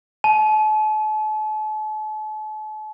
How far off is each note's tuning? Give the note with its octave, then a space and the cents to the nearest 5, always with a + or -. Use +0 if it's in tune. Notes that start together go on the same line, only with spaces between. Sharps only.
A5 -40